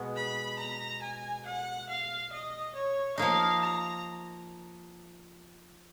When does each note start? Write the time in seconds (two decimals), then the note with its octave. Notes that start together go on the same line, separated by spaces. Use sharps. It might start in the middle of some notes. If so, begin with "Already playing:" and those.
Already playing: B2 G#3 B3
0.16 B5
0.58 A#5
1.02 G#5
1.45 F#5
1.89 F5
2.32 D#5
2.75 C#5
3.17 F3 A#3 D#4 F5
3.61 A#5